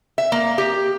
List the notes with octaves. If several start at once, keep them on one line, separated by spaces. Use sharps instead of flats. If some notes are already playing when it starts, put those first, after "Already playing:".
E5
A#3
G4